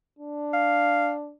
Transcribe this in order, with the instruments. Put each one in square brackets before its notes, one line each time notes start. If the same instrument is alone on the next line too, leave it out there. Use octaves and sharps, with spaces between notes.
[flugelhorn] D4
[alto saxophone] F5